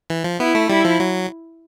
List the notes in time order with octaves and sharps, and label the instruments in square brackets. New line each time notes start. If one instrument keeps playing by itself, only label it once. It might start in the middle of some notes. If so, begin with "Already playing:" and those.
[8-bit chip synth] E3
F3
[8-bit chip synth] B3 [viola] E4
[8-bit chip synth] A3
[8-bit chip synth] G3 [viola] E4
[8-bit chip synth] F3
F#3